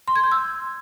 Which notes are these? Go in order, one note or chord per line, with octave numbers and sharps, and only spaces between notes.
C6
G#6
G6
E6